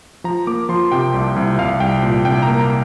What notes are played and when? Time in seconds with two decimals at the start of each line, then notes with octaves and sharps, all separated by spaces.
0.24 F3 A#5
0.47 A#3 D6
0.69 F3 C6
0.92 C3 G5
1.14 C2
1.36 C2
1.59 C2 F5
1.80 C2 G5
2.03 A#2
2.25 C2 G5
2.42 A#5
2.48 A#3
2.60 A#5